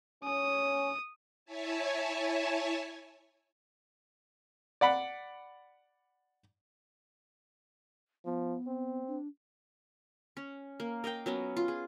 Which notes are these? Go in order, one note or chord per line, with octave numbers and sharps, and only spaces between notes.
C#4 D#6
E4 C#5 E5 G#5 A5
D5 F#5 B5
F3 B3
C4
D4
C#4
A#3
A#4 D#5 F5 G5
F#3 B3 C#4
F4
G#4